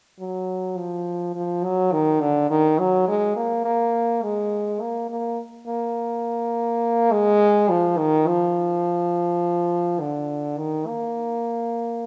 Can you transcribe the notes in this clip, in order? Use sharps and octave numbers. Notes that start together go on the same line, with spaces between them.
F#3
F3
F3
F#3
D#3
D3
D#3
F#3
G#3
A#3
A#3
G#3
A#3
A#3
A#3
G#3
F3
D#3
F3
D3
D#3
A#3